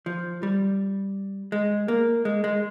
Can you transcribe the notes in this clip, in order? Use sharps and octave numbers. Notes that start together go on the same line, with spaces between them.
F3
G3
G#3
A#3
G#3
G#3